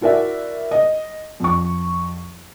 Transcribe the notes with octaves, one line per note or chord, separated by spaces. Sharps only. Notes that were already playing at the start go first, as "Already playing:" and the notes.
E4 F#4 A#4 D5 E5
D#5
F2 C#6